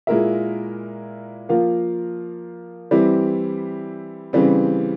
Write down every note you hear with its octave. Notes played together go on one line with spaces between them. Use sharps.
A#2 G#3 E4 A#4 E5
F3 A#3 F4 A#4 F5
E3 G3 C4 E4 G4
C#3 E3 G3 C4